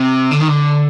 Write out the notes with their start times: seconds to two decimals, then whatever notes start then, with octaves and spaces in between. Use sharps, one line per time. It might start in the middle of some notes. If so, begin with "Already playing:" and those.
Already playing: C3
0.31 D3
0.40 D#3
0.48 D3